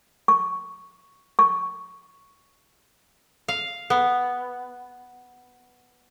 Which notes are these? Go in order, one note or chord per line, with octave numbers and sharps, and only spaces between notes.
C#6
C#6
F5
B3